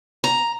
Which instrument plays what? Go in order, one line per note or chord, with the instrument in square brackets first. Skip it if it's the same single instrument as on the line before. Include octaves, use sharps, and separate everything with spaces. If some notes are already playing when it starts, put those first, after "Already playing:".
[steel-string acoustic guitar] A#5